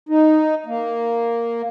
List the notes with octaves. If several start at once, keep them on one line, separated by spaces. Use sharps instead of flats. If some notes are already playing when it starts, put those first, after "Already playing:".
D#4
A#3